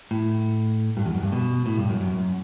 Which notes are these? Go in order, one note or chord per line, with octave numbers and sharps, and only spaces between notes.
A2
G2
E2
F#2
G2
B2
A2
G2
F#2
F#2